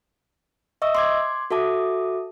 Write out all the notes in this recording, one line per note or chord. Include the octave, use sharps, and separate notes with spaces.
D#5 E5 C#6 D#6 E6
C6 D6 G#6
F#4 A4 E5 A5 D6 D#6